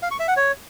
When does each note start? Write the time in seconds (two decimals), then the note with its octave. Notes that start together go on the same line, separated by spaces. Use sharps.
0.03 F5
0.11 C#6
0.19 E5
0.28 F#5
0.36 C#5